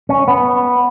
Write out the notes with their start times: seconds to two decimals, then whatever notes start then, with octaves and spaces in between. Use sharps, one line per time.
0.09 C#4
0.28 B3